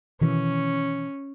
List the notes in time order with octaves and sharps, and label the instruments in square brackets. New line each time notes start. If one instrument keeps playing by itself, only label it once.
[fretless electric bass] B2 D#3 E3 [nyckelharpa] C#4